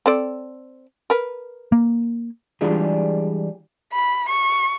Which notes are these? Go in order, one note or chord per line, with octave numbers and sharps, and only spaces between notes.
C4 A4 D5
A#4 B4
A#3
E3 G3 G#3 D4 F4 G#4
B5
C#6